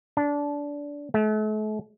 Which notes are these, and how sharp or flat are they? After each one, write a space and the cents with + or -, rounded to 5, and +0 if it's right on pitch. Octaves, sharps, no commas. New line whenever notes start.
D4 -20
A3 -40